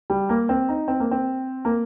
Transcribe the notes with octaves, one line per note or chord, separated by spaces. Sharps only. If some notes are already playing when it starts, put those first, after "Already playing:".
G3
A#3
C4
D#4
C4
A#3
C4
A#3